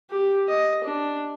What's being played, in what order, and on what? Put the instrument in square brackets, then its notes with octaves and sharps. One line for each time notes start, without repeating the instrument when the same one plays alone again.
[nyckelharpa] G4
D#5
D4